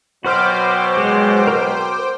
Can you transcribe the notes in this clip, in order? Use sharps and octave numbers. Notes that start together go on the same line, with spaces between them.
B2 F#3 F#4 B4 C5 G5 D6 F6
G#3
A#4 B4